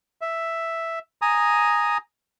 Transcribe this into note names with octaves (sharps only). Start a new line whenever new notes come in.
E5
G#5 A#5 D#6